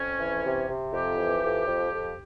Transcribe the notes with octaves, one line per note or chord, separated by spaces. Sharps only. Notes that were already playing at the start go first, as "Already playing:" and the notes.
Already playing: F2 C#4
E3
C3
C3
F2 G4
E3
F2
F2
F2